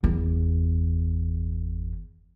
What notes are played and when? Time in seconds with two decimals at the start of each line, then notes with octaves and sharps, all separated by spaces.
0.03 G1 E2